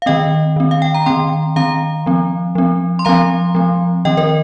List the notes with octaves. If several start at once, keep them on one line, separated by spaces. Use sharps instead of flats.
F5
D#3 C4 D#5 G5
D#3 C4
F5
G5
A#5
D#3 C4 G5 C6
D#3 C4 F5 A#5
F3 C4
F3 C4
C6
F3 C4 F5 A#5
F3 C4
D#3 C4 D#5 G5
A#4 D#5